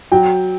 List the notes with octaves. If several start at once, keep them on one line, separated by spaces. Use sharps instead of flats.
F#3 G5